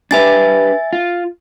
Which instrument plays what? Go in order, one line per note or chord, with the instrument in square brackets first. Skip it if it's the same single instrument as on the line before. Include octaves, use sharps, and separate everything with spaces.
[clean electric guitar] D4 G4 B4 [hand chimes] E5 G#5 A6
[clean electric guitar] F4